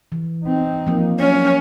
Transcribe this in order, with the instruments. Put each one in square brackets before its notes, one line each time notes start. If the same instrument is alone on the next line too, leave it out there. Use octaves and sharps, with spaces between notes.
[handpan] E3
[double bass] C4 D#4
[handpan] F3 A#3
[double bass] F#3 [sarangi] C#4